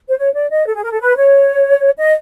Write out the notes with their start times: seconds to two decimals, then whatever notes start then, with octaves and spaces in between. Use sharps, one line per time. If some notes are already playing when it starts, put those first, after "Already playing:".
0.10 C5
0.17 C#5
0.34 D5
0.49 D#5
0.66 A4
0.74 G#4
0.83 A#4
0.91 A4
0.99 B4
1.15 C#5
1.98 D#5